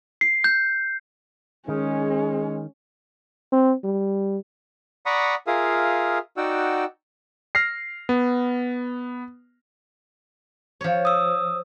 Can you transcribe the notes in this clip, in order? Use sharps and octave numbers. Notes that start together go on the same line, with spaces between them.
C7
G6
D#3 G#3 C#4 G#4
C4
G3
D5 F#5 A#5 B5 C#6 D#6
F4 G#4 A#4 E5 F5 D#6
D#4 F#4 D5 F#5 G5 E6
F6 A#6 C7
B3
F3 C#5
D#6 E6